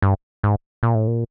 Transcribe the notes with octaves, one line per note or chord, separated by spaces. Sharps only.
G2
G#2
A#2
A2
A#2